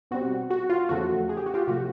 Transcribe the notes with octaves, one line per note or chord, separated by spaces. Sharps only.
B2 G3 C4 F#4
F#4
F4
E2 C#3 F3 A3 F#4
G#4
G4
F#4
F4 G4
C3 F3 A3 F#4